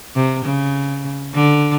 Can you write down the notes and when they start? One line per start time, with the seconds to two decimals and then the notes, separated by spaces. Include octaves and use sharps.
0.16 C3
0.45 C#3
1.34 D3